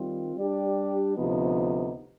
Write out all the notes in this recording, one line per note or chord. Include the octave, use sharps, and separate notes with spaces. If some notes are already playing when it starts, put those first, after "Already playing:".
Already playing: D#3 G3 C4 F4
G3 D4 G4 D5
D2 C3 F3 B3 D#4